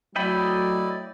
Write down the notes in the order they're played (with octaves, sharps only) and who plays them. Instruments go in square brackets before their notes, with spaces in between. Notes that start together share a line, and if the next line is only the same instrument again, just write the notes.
[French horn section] F#3 A3 [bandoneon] E4 D5 [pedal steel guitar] D#5 G5 B5